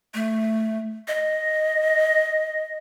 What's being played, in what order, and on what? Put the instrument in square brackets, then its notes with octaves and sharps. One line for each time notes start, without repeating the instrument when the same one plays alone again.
[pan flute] A3
D#5